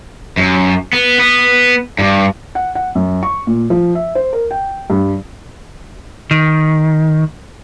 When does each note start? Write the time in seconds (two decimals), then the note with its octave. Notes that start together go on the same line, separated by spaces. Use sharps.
0.37 F#2
0.93 B3
1.20 B3
1.99 G2
2.55 F#5
2.75 F#5
2.95 F#2
3.23 C#6
3.47 A#2
3.70 F3
3.95 E5
4.15 C5
4.33 A#4
4.51 G5
4.90 G2
6.31 D#3